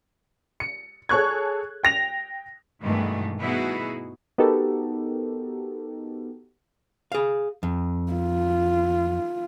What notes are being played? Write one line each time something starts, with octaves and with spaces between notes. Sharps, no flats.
C#7
G#4 A4 C#5 C#6 F#6 G#6
G5 A#6 F7
G2 B2 D#3 E3 G#3 A3
B2 B3 D#4 E4 F#4 G#4
B3 D#4 F#4 G4 A4 A#4
G#4 F5
F2
F4